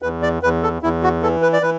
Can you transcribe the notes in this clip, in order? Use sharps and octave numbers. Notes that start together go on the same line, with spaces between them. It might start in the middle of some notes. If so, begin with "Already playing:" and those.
E2 B4
D5
E2 B4
A4
E2 E4
F#4
E3 A4
B4
D5
E3 B4